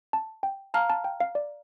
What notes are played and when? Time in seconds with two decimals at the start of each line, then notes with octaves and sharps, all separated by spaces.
0.13 A5
0.43 G5
0.74 F5 A5 A#5 F6
0.90 A5
1.04 G5
1.20 F5
1.35 D5